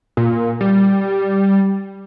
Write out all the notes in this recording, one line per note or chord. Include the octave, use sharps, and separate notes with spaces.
A#2
G3